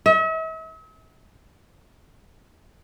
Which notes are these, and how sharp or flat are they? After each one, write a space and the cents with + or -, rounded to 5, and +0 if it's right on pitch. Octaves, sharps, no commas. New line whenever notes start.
E5 -45